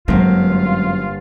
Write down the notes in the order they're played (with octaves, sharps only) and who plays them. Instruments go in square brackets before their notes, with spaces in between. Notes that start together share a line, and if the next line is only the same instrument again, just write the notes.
[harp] G1 A#3 [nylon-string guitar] F#2 C4 [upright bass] G#3 [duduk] F4